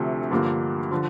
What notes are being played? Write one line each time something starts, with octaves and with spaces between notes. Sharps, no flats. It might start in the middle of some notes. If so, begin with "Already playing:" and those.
Already playing: D2 C3 F3 A3
G2 D3 F3 A#3
D3 F3